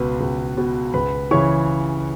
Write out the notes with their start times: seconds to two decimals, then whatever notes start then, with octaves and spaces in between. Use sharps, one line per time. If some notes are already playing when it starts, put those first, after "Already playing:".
Already playing: C#2 B2 B4
0.20 C#2
0.58 B2
0.94 C#2 B4 B5
1.31 C#3 E3 C#5 C#6